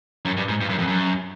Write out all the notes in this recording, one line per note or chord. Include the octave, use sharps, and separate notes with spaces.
F#2
G2
G#2
G2
F#2
F2
F#2